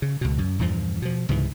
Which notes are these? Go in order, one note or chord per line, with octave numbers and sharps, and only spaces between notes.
C#3
C#2 B2
F#2
E2 G2 A#2 F3
B2 F3
C#2 G#2 C3 E3